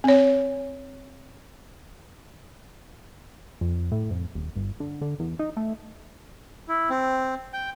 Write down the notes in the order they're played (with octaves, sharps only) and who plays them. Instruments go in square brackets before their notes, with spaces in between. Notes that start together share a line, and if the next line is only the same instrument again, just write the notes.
[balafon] C4 C#5
[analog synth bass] F2
A2
F2
D#1
G1
D3
D3
E2
D#4
A3
[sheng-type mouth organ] E4
C4
G5